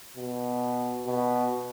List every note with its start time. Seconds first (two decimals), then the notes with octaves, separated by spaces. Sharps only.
0.17 B2
1.07 B2